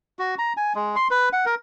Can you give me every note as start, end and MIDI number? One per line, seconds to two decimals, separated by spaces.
0.19 0.35 66
0.39 0.53 82
0.57 0.73 80
0.75 0.96 56
0.96 1.08 84
1.11 1.29 71
1.33 1.45 78
1.46 1.55 70